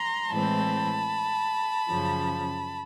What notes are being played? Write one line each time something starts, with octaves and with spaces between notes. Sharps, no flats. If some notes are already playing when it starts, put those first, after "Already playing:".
Already playing: A#5 C6
A2 E3 G#3 C4 A5 B5
F#2 C#3 F3